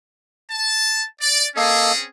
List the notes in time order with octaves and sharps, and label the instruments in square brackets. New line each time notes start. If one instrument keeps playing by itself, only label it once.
[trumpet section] A5
D5
[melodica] A#3 A4 D#5 [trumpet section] C4 C#4 G#4